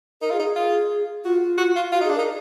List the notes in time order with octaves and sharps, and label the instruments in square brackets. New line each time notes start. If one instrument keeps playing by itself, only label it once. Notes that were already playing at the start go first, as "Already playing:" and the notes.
[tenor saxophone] D#4 [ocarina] A#4
[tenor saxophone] F4 [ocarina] G#4
[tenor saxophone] D#4
[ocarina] G#4
[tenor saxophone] F4
[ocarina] F4 [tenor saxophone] F#4
[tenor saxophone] F#4
F4
[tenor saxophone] F4 [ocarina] F#4
[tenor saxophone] D#4
[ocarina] G#4
[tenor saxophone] D4
[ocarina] A#4
[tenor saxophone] D#4